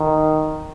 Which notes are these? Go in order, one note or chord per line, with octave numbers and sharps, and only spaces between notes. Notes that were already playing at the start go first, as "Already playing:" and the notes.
Already playing: D#3